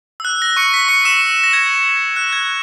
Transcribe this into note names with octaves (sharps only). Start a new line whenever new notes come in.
E6
F#6
A#6
C#6 C#7
B6
C#6 C#7
E6 E7
A#6
G#6
F#6
G#6